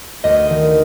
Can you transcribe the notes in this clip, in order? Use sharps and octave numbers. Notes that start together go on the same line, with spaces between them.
D2 D#5
D#3